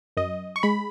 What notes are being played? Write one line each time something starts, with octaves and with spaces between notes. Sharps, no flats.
F#2 D#5
C#6
G#3 B5